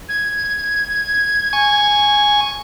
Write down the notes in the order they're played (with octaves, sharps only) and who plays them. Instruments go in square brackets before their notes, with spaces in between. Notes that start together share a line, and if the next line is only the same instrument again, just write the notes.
[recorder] G#6
[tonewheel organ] G#5 C#6